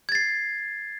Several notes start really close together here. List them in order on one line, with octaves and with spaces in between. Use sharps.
G#6 A6 C7